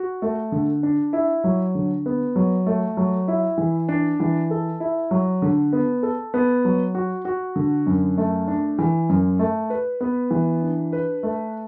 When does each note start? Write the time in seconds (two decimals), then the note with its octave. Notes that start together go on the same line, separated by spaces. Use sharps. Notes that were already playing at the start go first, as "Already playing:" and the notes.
Already playing: F#4
0.22 A3
0.52 D3
0.83 D4
1.13 E4
1.44 F#3
1.75 D3
2.06 B3
2.36 F#3
2.67 A3
2.97 F#3
3.28 E4
3.58 E3
3.88 D4
4.20 E3
4.51 A4
4.80 E4
5.11 F#3
5.42 D3
5.73 B3
6.03 A4
6.34 B3
6.65 F#3
6.95 F#4
7.25 F#4
7.56 D3
7.86 F#2
8.18 A3
8.48 D4
8.79 E3
9.09 F#2
9.39 A3
9.70 B4
10.01 B3
10.31 E3
10.62 D4
10.93 B4
11.23 A3